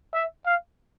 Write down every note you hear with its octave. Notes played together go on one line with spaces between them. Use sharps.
E5
F5